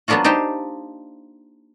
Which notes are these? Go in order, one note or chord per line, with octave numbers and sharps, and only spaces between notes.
F#3 A#3 B3 D4 F4 F#4
D4 D#4 G4 C5